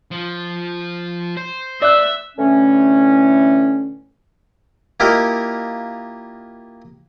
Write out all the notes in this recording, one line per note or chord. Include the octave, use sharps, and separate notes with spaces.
F3
C5
D5 E5 F#6
A2 D3 E3 A3 C#4
A#3 E4 F4 G4 A#4 D#5